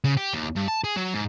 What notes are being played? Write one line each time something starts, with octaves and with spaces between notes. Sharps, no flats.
C#3
G4
D#2
G2
A5
G#4
F#3
G#2